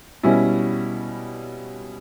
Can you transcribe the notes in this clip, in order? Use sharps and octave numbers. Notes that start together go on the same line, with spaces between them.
B2 G3 C#4 E4